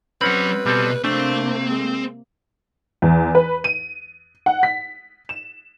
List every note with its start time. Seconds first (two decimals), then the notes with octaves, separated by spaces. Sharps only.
0.21 F#3 C4 C#4 B4 F#5 B5
0.66 B2 G3 C4 A4
1.04 C3 A3 A#3 C4 D4
1.70 G#3
3.02 E2
3.35 B4
3.64 D#7
4.46 F#5
4.63 B6
5.29 E7